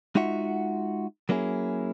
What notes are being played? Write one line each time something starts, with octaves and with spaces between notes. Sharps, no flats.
G#3 D#4 F4 F#4 E5 F#5
F#3 A#3 C#4 E4 G#4